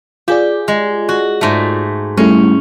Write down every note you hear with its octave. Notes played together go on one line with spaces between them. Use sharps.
F4 G4 G#4 D5
G#3
F#4
G#2 A3
G3 A3 C#4 E4